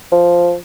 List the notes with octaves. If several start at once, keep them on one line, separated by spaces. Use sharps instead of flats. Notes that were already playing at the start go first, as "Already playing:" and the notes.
F3